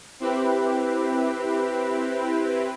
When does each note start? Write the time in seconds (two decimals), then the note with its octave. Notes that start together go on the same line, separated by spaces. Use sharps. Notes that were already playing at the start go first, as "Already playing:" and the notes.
0.20 C4 E4 G4 B4